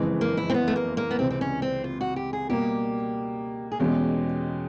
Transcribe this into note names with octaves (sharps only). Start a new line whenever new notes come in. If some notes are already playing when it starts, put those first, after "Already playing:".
Already playing: F#1 F2 C#3 E3 G#3
A#3
E4
C4
B3
A3
A#3
A#3
B3
C#2 C3 E3 C4
C4
C#4
C4
F4
F#4
G4
G#4
B2 G3 A#3 G4
G#4
E2 B2 G#3 C#4 G4